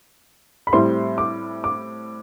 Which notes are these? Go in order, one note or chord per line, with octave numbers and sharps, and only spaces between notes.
B5
A2 G3 C4 C6
D6
D6